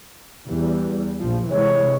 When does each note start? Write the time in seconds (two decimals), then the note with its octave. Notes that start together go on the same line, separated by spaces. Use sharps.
0.48 E2 E3 G3
1.20 A#1 F3
1.50 C3 E3 G#3 C#5